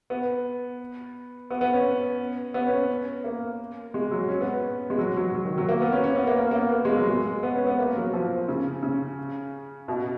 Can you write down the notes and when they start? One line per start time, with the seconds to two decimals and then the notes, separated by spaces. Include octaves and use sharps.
0.10 B3
1.50 B3
1.61 B3
1.73 C#4
2.54 B3
2.67 C#4
3.24 A#3
3.94 G#3
4.11 F#3
4.29 C#4
4.41 B3
4.90 G#3
4.98 F#3
5.17 F#3
5.35 F#3
5.45 D#3
5.58 F#3
5.69 A#3
5.81 B3
5.92 C#4
6.04 C#4
6.16 B3
6.27 A#3
6.39 A#3
6.51 A#3
6.56 B3
6.73 A#3
6.85 G#3
6.97 F#3
7.09 G#3
7.43 B3
7.55 C#4
7.67 B3
7.79 A#3
7.96 F#3
8.14 F3
8.48 C#3
8.83 C#3
9.88 B2